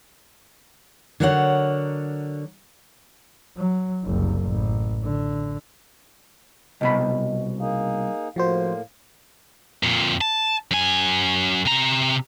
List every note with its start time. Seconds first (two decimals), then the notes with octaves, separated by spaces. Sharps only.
1.20 D3 F#3 A#4 C#5 F5 F#5
3.57 F#3
4.04 F#1 C2
4.44 A1
5.03 D3
6.81 C2 B2 D#5 B5
7.60 A#3 D#4 G#4 F5
8.36 A2 F3 A#3 F#4 C5
9.83 F2 A#2
10.21 A5
10.71 F#2 G#5
11.65 C3 A#5